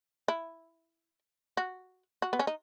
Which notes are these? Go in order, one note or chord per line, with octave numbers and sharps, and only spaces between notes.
E4
F#4
F#4
B3
C#4
D#4